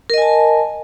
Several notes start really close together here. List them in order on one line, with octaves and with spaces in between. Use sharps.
A#4 D#5 G#5 A5